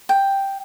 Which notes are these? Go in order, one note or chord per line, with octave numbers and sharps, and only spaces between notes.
G5